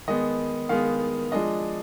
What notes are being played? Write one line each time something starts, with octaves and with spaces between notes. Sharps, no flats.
D#3 G#3 B3 D#5
D#3 G#3 B3 F5
F3 G#3 D4 D#5